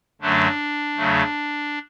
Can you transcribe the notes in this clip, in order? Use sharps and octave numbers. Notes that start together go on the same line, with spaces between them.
F#2 D3 F#3 A3 D4
E2 C#3 F#3 A3